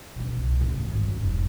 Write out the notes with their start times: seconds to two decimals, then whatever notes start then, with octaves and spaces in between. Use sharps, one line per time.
0.16 B2 D3
0.38 C2
0.61 A2 C#3
0.85 G#1
1.07 F#2 C4
1.22 F1 D#4